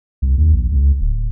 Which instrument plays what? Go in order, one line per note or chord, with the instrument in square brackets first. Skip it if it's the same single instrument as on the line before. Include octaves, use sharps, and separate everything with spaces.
[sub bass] C2
D#2
A#1
C#2
D1